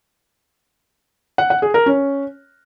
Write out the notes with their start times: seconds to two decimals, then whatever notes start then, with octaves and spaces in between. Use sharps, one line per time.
1.38 F#5
1.50 F#5
1.62 G#4
1.74 A#4
1.86 C#4